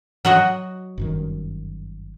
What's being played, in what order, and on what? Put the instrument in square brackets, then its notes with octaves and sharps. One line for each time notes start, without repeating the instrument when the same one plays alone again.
[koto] F#3 F#4 D#5
[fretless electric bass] G1 F#2 D#3